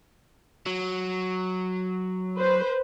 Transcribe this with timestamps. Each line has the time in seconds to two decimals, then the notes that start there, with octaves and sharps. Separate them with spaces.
0.66 F#3
2.36 B4 C5